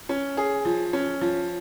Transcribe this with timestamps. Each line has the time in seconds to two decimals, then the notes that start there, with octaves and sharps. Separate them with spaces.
0.09 C#4
0.37 G#4
0.65 F3
0.93 C#4
1.21 F3